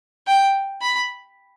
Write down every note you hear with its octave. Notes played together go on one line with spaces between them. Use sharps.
G5
B5